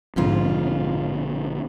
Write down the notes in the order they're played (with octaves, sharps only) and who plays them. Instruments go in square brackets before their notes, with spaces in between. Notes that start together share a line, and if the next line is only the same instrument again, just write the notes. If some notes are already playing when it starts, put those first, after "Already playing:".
[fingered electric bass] A#1 B2 D3 [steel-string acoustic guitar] F2 G#2 F4